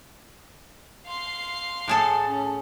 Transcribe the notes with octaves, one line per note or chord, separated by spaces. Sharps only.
F5 C6
A2 G#4 A4
C#4